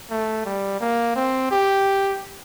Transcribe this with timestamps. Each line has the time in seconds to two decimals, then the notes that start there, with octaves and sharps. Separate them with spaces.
0.10 A3
0.46 G3
0.81 A#3
1.16 C4
1.51 G4